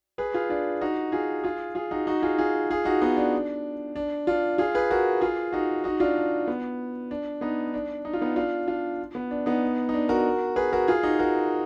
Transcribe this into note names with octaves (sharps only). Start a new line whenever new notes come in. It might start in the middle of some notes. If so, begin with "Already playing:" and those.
G#4 B4
F4 G#4
D4 F4
D#4 F#4
F4 G#4
F4 G#4
F4 G#4
D#4 F#4
D#4 F#4
F4 G#4
F4 G#4
F4 G#4
D#4 F#4
B3 D#4
D4
D4
D4 F4
F4 G#4
G#4 B4
F#4 A#4
F4 G#4
D#4 F#4
D#4 F#4
D4 F4
D4
B3
D4
B3 D#4
D4
D#4
F4
B3 D#4
D4 F4
D4 F4
B3
D4
B3 D#4
D#4
D4
F#4 A#4
G#4 B4
F#4 A#4
F4 G#4
D#4 F#4
F#4 A#4